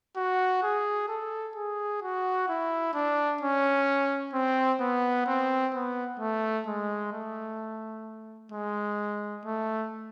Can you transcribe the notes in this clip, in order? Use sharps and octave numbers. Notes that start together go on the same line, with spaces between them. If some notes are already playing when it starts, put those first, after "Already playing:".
F#4
G#4
A4
G#4
F#4
E4
D4
C#4
C4
B3
C4
B3
A3
G#3
A3
G#3
A3